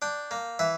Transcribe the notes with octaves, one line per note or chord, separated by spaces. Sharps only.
D4 G5
A#3
E3 E5